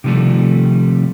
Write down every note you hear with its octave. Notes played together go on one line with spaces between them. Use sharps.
C3 D#3 F3 G3 A3